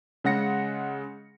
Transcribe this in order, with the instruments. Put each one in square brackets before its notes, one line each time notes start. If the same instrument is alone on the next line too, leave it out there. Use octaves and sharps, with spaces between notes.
[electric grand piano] C#3 G#3 F#5 A#6 C#7